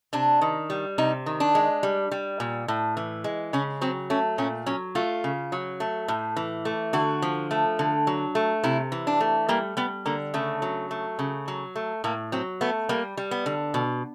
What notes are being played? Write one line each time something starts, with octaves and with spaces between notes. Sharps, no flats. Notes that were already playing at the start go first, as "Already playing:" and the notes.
C3 D4
D#3
G3
C3 D#4
D#3
D4
G#3
G3
G3
A#2
A2
E3
G#3
C#3 C#4
F#3 C4
A3 C#4
A#2 C#4
F#3 C#4
A3 F4
C#3
F#3
A3
A2
E3
A3
D3 F#4
F3
A3
D3
F#3
A3
C3 E4
E3
D4
A3
G3 A#3
G3 B3
D3 A#3
C#3 A3
F#3
A3
C#3
F#3
A3
A2 A#3
F#3 C4
A3 B3
G3 A#3
G3
B3
D3
B2